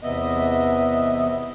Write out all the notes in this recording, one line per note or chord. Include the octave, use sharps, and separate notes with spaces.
E2 C3 B3 D#5 E5